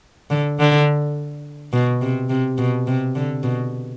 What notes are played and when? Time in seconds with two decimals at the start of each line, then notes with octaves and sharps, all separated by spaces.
0.30 D3
0.59 D3
1.73 B2
2.02 C3
2.30 C3
2.58 B2
2.87 C3
3.15 D3
3.43 B2